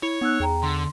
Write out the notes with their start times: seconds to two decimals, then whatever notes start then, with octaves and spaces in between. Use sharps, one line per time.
0.03 E4 C#5
0.21 B3 D#4 E6 F#6
0.40 E2 G#4 G5 A#5
0.63 D3 C6